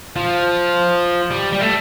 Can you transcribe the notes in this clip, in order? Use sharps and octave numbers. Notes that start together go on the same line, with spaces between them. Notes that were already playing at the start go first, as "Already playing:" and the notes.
F3
G3
G3
A3